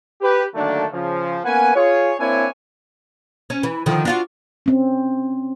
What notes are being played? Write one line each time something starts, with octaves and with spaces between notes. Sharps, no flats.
G4 B4
D3 D#3 F#3 A3 A#3 D4
C#3 F3
A#3 B3 C#4 B4 F#5 G#5
F4 G#4 C#5
A#3 C4 D4 E4 C#5 G#5
C#4
E3
D3 D#3 F3
D4 F4 F#4
C4 C#4